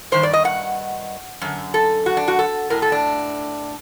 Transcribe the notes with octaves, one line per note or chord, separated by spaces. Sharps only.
G2 D#3 C5
D5
D#5
F#5
F#2 D3
A4
F#4
D4
F#4
A4
A2 A#4
A4
D4